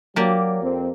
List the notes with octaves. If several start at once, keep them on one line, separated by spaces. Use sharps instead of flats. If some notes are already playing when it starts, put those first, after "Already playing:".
F#3 A#3 G4 D5
F2 C4